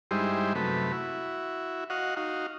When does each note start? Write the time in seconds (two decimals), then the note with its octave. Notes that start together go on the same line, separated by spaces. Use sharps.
0.11 G2 G3 G#3 D#4 E4 C5
0.55 F#2 C3 A3 B4
0.92 E4 F#4
1.90 F#4 D#5 F5 F#5
2.17 D#4 F#4 F5